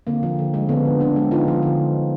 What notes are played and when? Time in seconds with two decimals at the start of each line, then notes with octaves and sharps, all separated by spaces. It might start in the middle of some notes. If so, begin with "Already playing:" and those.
0.07 D3 A#3 C4
0.23 F3
0.39 D3
0.54 G#3
0.69 D3 B3 C#4
0.85 F3
1.00 D3 C4 D4
1.16 G#3
1.31 D3 D#4 F4
1.48 F3
1.63 D3